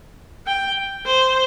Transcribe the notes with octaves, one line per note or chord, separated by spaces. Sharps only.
G5
C5